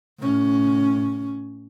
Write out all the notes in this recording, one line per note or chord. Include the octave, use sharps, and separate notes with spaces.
A2 C#4